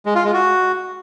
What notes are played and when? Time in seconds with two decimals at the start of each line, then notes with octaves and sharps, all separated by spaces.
0.06 G#3
0.15 F4
0.24 G#3
0.34 F#4